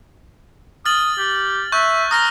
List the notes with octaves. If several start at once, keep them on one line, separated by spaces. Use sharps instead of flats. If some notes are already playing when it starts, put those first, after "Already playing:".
D#6 F6 A6 F#7
G4
E5 C#6 F#6 G6
A#5 D#6 F6 A#6